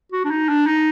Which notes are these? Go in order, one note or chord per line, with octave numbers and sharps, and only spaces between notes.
F#4
D4
D#4
D4
D#4